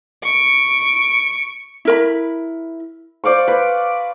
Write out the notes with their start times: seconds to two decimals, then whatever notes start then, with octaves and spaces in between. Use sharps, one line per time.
0.24 C#6 D7
1.85 E4 A#4 B5
3.24 C5 D5 F5 C#6
3.48 B4